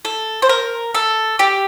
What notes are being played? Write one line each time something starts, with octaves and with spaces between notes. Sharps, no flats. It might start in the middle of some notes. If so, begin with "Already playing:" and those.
A4
C5
A#4
A4
G4